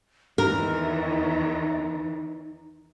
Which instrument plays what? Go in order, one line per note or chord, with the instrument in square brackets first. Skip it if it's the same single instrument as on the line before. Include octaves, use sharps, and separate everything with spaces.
[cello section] E2 D#3 E3 [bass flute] D#4 [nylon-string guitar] A#4